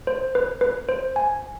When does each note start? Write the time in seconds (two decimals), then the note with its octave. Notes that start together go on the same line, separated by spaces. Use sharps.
0.07 C5
0.35 B4
0.61 B4
0.89 C5
1.16 G#5